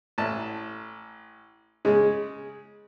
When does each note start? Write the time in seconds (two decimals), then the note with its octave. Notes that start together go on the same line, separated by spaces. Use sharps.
0.18 A1 A5
1.85 C#3 G#3